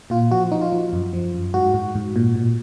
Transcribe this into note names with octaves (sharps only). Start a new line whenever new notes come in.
A#2 F4
F3 F#4
F3 D#4
F4
F3
F#2
F3
F#2
G#2 F#4
G#2
G#2
A#2
A#2